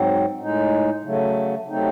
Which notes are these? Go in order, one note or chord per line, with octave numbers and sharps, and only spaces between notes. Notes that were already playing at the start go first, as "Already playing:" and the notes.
Already playing: G#2 F#3 C4
A2 G#3 D#4
C#3 F#3 A3
C3 F#3 A3 C4 D#4